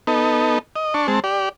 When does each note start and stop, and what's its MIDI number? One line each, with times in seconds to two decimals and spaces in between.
0.07 0.59 59
0.07 0.59 63
0.07 0.59 69
0.76 0.94 75
0.94 1.07 62
0.94 1.07 81
0.94 1.07 85
1.08 1.20 56
1.08 1.20 60
1.08 1.20 81
1.24 1.49 67
1.24 1.49 74